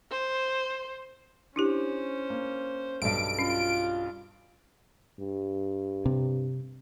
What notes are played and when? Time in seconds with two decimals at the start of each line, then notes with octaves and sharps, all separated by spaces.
0.11 C5
1.56 C#4 D4 E4 G4 C5
2.30 A#3
3.02 B1 G2 A4 D7
3.39 C#4 F4
5.20 G2
6.06 C3